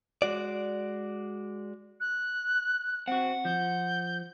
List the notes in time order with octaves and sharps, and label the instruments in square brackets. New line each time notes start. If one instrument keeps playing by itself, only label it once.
[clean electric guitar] G#3 F#4 D5
[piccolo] F#6
[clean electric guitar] C4 F#4 [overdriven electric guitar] F#5
[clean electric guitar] F3 [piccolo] G6